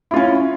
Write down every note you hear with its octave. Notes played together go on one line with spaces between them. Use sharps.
C#4 E4 F4